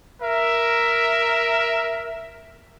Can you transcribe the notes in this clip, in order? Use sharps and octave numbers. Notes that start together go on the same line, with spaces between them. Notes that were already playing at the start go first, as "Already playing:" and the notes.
A#4 E5